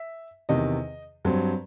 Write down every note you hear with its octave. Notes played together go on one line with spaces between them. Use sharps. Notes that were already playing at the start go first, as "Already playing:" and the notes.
Already playing: E5
E2 C3 D#3 D#5
G2 F#3 C4